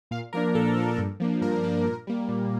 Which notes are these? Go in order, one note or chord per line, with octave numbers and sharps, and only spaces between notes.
A#2 F5
F3 A#3 D4 A#4
A#2 A4
F3 A#3 D4
G2
F3 A#3 D4
G2 A#4
F3 A#3 D4
A#2
G3 A#3
A#2